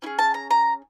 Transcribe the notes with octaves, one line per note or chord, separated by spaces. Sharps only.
C#4 E4 G#4
A5
A#5
A#5